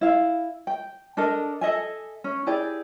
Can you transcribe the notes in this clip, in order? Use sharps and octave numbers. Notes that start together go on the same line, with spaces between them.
E4 F5
G5
D4 A4 A#4 D#5
A4 D#5 E5 G#5
C#4
E4 G4 G#4 D5